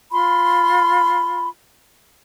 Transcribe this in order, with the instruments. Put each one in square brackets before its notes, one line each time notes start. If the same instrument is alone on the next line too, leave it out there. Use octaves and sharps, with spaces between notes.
[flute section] F4 B5 C6